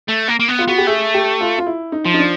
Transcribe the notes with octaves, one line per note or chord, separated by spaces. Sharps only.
A3
A#3
A#3
B3
F4
B3 F#4
G4
A3 G#4
G4
F4
F4
E4
D#4
F3
D#4
D4